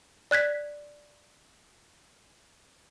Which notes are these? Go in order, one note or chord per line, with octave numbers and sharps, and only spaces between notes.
D5 F#6 G#6 B6